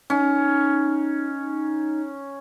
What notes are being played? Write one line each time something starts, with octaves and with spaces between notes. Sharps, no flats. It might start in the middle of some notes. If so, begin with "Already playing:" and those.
C#4 D#4